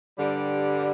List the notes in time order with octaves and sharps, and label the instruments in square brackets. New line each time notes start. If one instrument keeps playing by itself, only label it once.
[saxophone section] G2 D3 G3